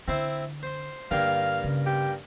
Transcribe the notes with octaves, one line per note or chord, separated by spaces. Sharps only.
D3 C4 E4 C5
C5 C6
G2 D3 A#3 F5 G5
C#3
G4